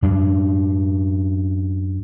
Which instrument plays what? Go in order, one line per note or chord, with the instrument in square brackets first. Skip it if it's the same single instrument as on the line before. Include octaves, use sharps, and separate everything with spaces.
[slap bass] F#2 D4